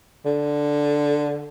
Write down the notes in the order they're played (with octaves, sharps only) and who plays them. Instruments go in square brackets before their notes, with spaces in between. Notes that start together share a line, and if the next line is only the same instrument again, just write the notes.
[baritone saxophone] D3